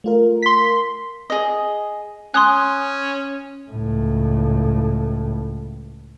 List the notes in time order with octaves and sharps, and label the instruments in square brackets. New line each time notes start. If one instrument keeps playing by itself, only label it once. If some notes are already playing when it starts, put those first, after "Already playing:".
[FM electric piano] A3 F4 A#4
[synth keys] C6 B6
[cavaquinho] G#4 D#5
[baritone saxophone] C#4 [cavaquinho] G#5 [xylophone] C6 D#6 F#6
[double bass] C#2 A2